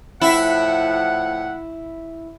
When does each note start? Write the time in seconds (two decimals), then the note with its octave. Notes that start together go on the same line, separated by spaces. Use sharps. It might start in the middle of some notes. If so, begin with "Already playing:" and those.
0.21 A2 F3 E4 F#5